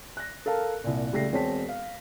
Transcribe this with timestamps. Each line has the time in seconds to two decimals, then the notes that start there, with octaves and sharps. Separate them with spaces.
0.17 F#6 A#6
0.46 A4 A#4 F5 A5
0.84 C2 A#2
1.12 C#2 G3 A3 A#6 C7
1.32 E1 C4 C#5 A5 B6
1.69 F5